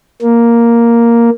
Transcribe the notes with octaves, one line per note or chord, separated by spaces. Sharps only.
A#3